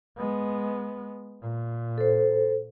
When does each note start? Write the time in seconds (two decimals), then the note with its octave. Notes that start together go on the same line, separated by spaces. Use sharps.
0.18 G#3 B3
1.42 A#2
1.98 A4 C5